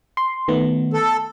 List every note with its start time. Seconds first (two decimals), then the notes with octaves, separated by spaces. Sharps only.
0.17 C6
0.48 D#3 A3 B3
0.93 A4